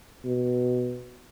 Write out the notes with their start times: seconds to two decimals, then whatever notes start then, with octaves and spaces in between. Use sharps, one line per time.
0.25 B2